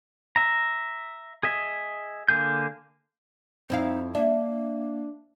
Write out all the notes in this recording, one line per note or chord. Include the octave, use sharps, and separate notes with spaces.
E5 A#5
G#4 D#5 E5
D3 A#3 G#4 G6
F2 C4 D#4 E4 F5
A#3 D4 E5